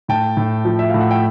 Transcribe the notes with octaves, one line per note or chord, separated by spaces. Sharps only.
A2 G5 A5
A2
F3
E5
A2 F5
F#5
G5